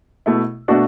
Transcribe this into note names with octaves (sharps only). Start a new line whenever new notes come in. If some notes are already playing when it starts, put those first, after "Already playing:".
B2 A3 E4
B2 A3 D4 F#4